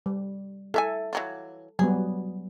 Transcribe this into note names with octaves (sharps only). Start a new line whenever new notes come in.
G3
E4 A4 E5 G#5
E3 F#3 F4
F#3 G3 B3 G#4